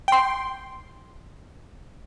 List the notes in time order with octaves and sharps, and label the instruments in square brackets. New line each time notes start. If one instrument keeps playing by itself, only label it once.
[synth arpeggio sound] G5 C6